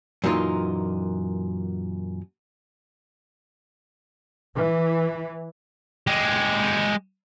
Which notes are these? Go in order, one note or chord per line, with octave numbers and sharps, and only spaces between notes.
F#2 A#2 E3 D#4 F4
E3
G#3 G4